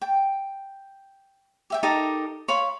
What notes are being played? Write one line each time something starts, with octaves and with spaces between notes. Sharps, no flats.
G5
G4 E5 G5
D#4 G4 A4 A#4
C#5 F5 B5 C6